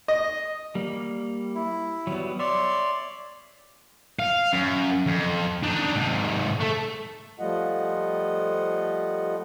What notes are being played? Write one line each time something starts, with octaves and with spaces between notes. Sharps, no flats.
D#5
G3 A#3
E4
F#3 G3 B3
C#5 D5 E5 C6
F5
F#2
F2
D4 D#4
G#2 C3
A3 A4
F3 G3 A3 F4 D#5 F#5